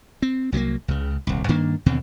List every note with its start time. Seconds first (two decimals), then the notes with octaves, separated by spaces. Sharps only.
0.22 C4
0.52 C2 F#3 G3 A#3
0.88 C#2 C#3
1.27 D#1 C2
1.48 G2 D#3 A#3 D4
1.86 D#2 B2 D3 C4